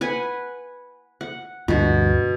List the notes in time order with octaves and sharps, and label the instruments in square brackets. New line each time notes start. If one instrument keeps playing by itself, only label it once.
[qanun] B4 F#5 G#5
F#5
[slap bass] D2 G2 [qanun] B2 F#4